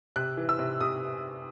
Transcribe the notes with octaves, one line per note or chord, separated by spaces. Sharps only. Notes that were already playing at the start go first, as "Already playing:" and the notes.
C3 F#6
E3
E6
C3
C3 D#6